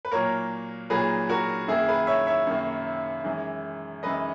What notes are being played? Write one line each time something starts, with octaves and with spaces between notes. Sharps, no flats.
B4
A#2 F#3 A#3 A#4 C#5
A#2 F#3 A#3 G#4 B4
F#4 A#4
F#2 D#3 A#3 E4 G#4
G#4 B4
C#5 E5
C#5 E5
F#2 D#3 A#3
F#2 E3 G#3
F#2 E3 G#3 B4 D#5